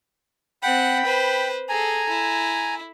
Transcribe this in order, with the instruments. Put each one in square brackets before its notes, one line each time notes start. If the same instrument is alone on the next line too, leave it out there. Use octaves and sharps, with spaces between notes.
[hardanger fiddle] C4 F#5 [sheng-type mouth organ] G5 B5
[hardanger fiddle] B4 C5
[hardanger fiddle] G#4 A4 [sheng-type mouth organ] G#5 A#5
[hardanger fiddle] E4